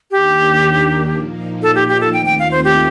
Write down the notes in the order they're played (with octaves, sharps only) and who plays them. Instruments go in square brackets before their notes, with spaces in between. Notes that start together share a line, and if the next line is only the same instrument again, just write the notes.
[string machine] D#2 D#3 A#3 D4 [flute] G4
[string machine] A#2 F3 A#3 D#4
[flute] A4
G4
G4
A4
[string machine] D#2 D#3 A3 C4 F4 [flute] G5
[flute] G5
F5
C5
G4